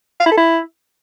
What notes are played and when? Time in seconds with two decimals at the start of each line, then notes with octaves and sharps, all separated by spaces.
0.20 F5
0.26 E4
0.32 A4
0.38 E4